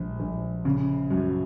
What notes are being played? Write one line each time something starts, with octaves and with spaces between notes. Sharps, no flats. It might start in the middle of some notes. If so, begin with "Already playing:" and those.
Already playing: A#1 G#3
A#1
C#3
F#2